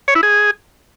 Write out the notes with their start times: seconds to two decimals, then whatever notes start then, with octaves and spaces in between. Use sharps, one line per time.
0.08 C#5
0.15 E4
0.23 G#4